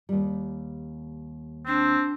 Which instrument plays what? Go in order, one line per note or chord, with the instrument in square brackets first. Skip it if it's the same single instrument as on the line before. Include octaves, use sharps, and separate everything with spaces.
[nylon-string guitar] D#2 G3
[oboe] C4 [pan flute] D4